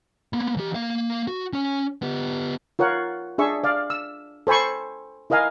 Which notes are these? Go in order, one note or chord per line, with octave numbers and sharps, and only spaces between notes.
A#3 B3
E3 G4
A#3 F5
F#4
C#4 G#5
B3 G4
F4 A#4 C#5 F#5
D4 G#4 E5 C#6
D5 F5
E6
A4 C5 G#5 B5 C#6
E4 A#4 D#5 F5 G#5